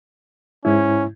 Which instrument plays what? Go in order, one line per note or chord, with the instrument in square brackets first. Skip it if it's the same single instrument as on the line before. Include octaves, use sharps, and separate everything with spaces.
[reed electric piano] G#2 E4 [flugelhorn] C#4